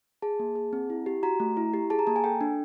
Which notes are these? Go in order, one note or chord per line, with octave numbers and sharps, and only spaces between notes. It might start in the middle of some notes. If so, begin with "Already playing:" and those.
G#4 A5
A#3
G#4
C4
E4
G4
F#4 A#5
A3
E4
G4
G#4 A5
A#5
A#3 A5
G#5
A4 G5
D4